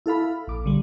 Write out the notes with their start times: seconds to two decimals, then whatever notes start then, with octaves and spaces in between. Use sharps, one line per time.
0.06 E4 A4 F5 B5
0.47 A#1 D6
0.64 B1 D3 G3